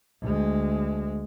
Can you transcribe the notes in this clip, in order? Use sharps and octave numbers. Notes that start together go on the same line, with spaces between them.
D2 G#3